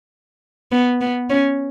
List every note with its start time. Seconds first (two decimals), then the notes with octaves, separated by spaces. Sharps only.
0.71 B3
1.01 B3
1.30 C#4